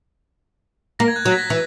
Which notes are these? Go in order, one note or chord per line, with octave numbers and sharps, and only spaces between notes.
A#3 A#6
G#6
F#6
F#3 G#6
B6
A#6
E3